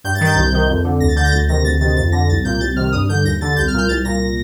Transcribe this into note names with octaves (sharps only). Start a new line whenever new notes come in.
G2 G6
A6
D#3 G6
C2
C3 D#3
F2
D3
D2 A#6
A6
D3 G6
A#6
D2 A6
C3 D#3 A#6
D2 A6
C3 D#3 A6
F2 A6
D3 A#6
C2 A6
A#2 G6
C2 A6
C3 D#3 F6
G2 D#6
D3 G6
D#2 A#6
D3 A6
C2 G6
F6
A#2 G6
C2 A6
A#2 A#6